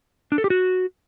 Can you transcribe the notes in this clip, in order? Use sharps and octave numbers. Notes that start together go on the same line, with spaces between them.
D4
A4
G4
F#4